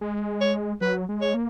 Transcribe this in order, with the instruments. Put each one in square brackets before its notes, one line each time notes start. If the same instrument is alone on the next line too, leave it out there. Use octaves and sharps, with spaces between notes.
[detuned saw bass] G#3
[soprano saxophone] C#5
[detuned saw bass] F#3 [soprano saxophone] B4
[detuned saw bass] G#3
[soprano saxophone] C#5
[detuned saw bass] A#3